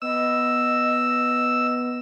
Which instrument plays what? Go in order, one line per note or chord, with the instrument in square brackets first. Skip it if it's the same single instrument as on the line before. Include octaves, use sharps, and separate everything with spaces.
[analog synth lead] B3 [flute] D#5 [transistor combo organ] E6